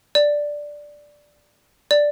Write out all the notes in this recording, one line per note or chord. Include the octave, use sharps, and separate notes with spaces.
D5
D5